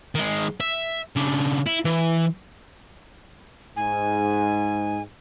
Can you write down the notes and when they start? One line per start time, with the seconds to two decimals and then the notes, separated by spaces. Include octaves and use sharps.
0.15 D#3 G#3
0.60 E5
1.16 C#3 D4
1.67 E4
1.85 E3
3.76 G#2 G#5